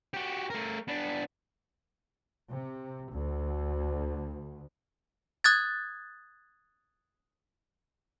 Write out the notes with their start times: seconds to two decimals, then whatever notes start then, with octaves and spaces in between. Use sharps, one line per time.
0.14 F#4 G4
0.50 A3 A#4
0.88 B3 D4
2.50 C3
3.13 D2
5.44 D#6 F#6 G#6 A6